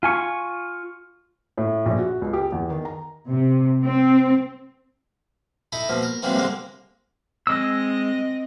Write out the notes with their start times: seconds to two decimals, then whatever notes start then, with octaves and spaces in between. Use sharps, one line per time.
0.03 F4 G#5 C#6
1.57 A2
1.86 A#1
1.98 F#4
2.22 C#2
2.33 G4
2.52 E2
2.70 D#3
2.85 A#5
3.28 C3
3.83 C4
5.72 D#4 E4 A4 D#5
5.89 B2 F3 A#3
6.02 A#4
6.22 E3 F#3 G#3 A#3 C4 D#4
6.35 C2 D3 G#3 A#3 C4
7.47 G#3 C4 D#5 E6